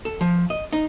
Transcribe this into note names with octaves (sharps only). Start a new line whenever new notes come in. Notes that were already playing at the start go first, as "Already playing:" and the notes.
A4
F3
D#5
D#4